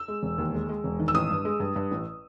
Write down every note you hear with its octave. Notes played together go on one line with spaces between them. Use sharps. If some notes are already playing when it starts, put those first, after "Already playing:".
Already playing: E6
G#3
E1
D#2
G#3
G#3
E1
D#3
E6
A1 D#6
G2
G#3
G2
G2
A1